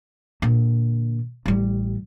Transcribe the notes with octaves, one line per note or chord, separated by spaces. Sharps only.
A#2 D3
A1 G3